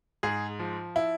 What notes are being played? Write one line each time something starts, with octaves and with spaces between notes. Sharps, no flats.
G#2 G#4
F3
E4